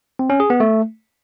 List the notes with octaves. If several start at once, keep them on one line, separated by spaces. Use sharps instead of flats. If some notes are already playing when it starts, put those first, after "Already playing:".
C4
C#4
G#4
B3
A3